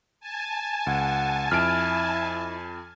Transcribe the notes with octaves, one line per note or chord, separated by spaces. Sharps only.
G#5 A5
C#2 F#5
F2 E4 F6 D7